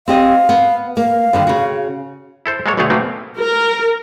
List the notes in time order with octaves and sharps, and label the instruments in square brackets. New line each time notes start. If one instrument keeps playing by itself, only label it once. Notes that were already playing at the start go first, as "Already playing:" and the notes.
[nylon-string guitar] C4 G4 D#5 [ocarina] F5
[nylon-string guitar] B3
[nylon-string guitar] A#3 [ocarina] F5
[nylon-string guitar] G2 D3 D#3
C#3 F#4
[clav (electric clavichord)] E4 A4 C5
G#3 A#3 A4 C#5
B1 B2 D3 A3 G#4 C#5
B2 A3 A#3 C4
[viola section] A#4